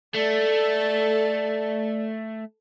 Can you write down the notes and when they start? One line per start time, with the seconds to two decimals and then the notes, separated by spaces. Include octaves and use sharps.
0.15 A3 A4 D5